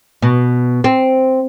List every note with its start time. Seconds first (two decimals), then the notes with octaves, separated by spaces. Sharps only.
0.22 B2
0.84 C4